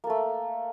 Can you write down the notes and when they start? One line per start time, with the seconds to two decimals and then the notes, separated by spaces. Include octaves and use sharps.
0.04 A#3
0.07 A4
0.10 A3